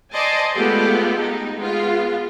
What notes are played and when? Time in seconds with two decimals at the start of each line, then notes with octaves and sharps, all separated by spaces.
0.13 C5 D5 D#5 G#5 A5 C6
0.54 G#3 A3 B3 F4 G4 A4
1.18 D#4
1.56 G#3 B3 F4